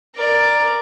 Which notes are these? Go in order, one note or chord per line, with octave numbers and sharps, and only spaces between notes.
A#4 D5